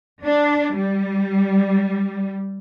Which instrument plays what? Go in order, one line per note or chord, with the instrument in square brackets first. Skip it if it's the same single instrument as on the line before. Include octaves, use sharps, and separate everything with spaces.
[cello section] D4
G3